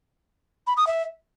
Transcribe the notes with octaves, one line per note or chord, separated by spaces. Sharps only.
B5
D#6
E5